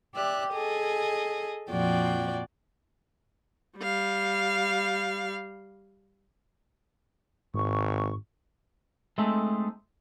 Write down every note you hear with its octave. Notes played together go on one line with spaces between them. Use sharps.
G4 D5 E5 F#6
G#4 A4 D#5 G#5
F2 A#2 F3 F#4 D5 G5
G3 F5
G#1 G#2 C#6
G#3 A3 C4 D#4 G#4 A4